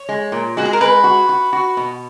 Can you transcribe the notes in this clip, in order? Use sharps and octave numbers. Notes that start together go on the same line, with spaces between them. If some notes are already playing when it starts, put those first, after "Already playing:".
Already playing: C#5
G#3
A#2
G#3 F#4
G#4
A#4
G#3 B4
F#4
F#4
F#4
B2